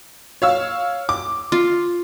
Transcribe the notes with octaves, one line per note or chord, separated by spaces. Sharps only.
C#5 F5 E6
D6
F4